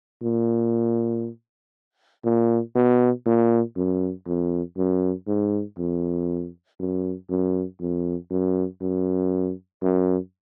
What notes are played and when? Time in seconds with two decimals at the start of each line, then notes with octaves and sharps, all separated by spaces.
0.23 A#2
2.25 A#2
2.75 B2
3.26 A#2
3.76 F#2
4.27 F2
4.77 F#2
5.27 G#2
5.78 F2
6.80 F#2
7.30 F#2
7.80 F2
8.30 F#2
8.81 F#2
9.82 F#2